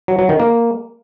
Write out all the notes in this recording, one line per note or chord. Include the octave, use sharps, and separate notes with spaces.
F#3
F#3
D#3
A#3